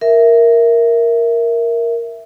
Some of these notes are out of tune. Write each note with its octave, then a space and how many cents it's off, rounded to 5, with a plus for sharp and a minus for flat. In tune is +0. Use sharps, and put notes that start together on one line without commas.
A#4 +0 E5 +0